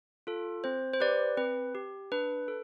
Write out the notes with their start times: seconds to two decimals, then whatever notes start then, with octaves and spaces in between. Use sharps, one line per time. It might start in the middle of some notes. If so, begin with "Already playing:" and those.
0.27 F4 A4
0.64 C4 C5
0.93 C5
1.00 G4 B4 D5
1.37 C4 B4
1.75 G4
2.12 D4 B4
2.48 A4